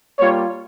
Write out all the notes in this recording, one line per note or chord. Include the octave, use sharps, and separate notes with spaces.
G3 A#3 F4 C#5